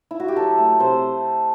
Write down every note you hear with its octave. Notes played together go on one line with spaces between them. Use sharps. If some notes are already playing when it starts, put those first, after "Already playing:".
E4
F#4
G4
F#3 A4
A3
C3 C5